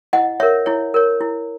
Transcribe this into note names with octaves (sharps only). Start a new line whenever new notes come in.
E4 D#5 F#5
A#4 C#5 E5
E4 C#5
A#4 C#5
E4